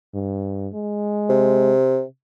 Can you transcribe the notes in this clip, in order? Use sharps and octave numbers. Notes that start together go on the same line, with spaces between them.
G2
G#3
C3